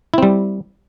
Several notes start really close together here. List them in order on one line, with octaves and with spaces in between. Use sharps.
E4 C4 G3